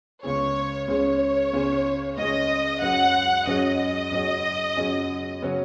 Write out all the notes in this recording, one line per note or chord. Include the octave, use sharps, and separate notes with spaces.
C#2 C#3 G#3 C#4 G#4 C#5
C#2 C#3 G#3 C#4 G#4 C#5
C#2 C#3 G#3 C#4 G#4
C#2 C#3 G#3 C#4 G#4 D#5
F#2 F#3 C#4 G#4 F#5
F#2 F#3 C#4 G#4 D#5
F#2 F#3 C#4 G#4
F#2 F#3 C#4 G#4
C#3 F#3 C#4